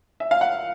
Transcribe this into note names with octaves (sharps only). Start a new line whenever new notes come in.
E5
F5
F#5